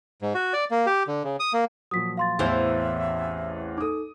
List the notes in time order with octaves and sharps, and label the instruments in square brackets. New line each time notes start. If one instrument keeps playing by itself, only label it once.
[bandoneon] G#2
F#4
D5
A#3
G4
D3
C#3
D#6
A#3
[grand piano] A#2 F3 F#3 [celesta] D#6 B6
[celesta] F5 C6 A6
[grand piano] A1 E2 [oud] E3 C4 [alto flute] E5
[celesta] D#4 A4 [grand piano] D6 D#6